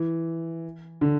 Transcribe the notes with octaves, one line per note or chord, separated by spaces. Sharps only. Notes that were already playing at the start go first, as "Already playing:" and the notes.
Already playing: E3
D3